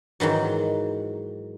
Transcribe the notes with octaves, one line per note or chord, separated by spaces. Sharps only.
G#2 D#3 E3 F#3